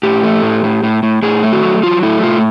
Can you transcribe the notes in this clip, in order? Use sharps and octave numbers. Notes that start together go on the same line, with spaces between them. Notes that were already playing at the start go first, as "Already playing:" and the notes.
A2 G4
A3
A2
A2
A2
A2
A2 G#4
A3
F#4
F#3
F#3 F4
A3 E4
A2 F4